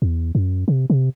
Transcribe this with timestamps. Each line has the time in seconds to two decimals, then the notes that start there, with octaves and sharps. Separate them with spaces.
0.02 E2
0.35 F#2
0.68 C3
0.90 C3